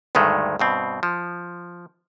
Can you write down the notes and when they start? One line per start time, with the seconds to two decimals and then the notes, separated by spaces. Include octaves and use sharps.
0.15 D2 G2 D#3 G#3 A3
0.59 G2 B2 C4
1.03 F3